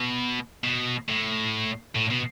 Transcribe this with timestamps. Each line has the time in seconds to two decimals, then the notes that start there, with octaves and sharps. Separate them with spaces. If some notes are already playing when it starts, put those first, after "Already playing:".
Already playing: B2
0.64 B2
1.08 A2
1.95 A2
2.10 B2